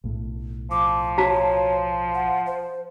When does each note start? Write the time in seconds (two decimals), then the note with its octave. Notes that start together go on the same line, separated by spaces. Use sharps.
0.04 B1 A2
0.71 F3 D6
1.18 F#4 C#5 A5 A#5
2.14 F#5
2.46 C5